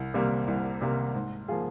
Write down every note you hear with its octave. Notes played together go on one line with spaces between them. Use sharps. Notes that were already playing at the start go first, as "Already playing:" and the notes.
Already playing: C2
C3 G3 A#3
C2
C3 G3 A#3
G#2
F3 A#3 F4 G#4